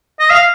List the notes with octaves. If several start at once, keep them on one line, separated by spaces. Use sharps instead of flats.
D#5
F5